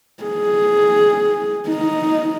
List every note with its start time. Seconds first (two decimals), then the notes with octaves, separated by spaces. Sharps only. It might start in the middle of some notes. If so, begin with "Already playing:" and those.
0.23 G#4
1.68 D#4